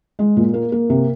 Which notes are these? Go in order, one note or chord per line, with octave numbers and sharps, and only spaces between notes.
G#3
A#2
A#3
A#3
C3